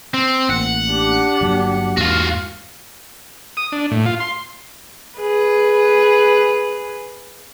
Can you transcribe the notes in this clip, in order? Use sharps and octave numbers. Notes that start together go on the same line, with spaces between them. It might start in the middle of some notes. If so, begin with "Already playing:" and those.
C4
A1 A#3 F#5
D4 G4
G1 F#3 A#3
E2 G#2 A#3 F4 F#4 F5
D#6
D4
A2
F4
C6
G#4 B4